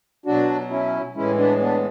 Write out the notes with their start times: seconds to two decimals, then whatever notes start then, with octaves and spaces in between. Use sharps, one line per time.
0.26 B2 F#3 D4 F#4
0.70 C#4 E4
1.15 A2 E3 G#3 C#4 E4
1.38 B3 D4
1.60 B3 D4